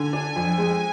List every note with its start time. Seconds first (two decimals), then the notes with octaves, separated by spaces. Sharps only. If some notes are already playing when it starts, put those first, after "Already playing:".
Already playing: D3 G#5
0.13 D4
0.36 F2
0.58 G#3